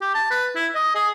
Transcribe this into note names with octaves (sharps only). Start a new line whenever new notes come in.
G4
A5
B4
E4
D#5
G#4